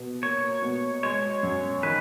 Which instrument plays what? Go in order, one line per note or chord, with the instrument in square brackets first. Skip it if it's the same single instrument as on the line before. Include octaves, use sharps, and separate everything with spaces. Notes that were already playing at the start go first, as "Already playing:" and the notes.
Already playing: [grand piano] B2 A#3
[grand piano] A#3 [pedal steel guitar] C#5
[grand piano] B2
[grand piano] G#3 [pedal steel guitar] C#5
[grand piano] F#2
[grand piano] D#3 [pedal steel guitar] B4